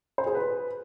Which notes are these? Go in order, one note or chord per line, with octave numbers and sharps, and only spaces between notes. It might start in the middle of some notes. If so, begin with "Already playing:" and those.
C5
G#4
B4